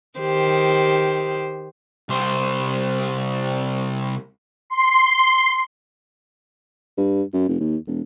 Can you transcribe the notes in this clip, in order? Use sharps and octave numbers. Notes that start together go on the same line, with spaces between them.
D#3 G4 C5
C2 C5
C6
G2
F#2
F1
D#2
E1